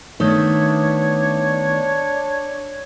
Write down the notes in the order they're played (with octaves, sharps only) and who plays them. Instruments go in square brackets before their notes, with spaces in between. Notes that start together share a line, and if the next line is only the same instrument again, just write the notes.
[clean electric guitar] D#3 [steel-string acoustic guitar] A3 B3 E5 [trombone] D4 [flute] C#5